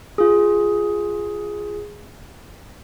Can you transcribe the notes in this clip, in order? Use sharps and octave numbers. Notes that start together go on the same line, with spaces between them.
F4 G#4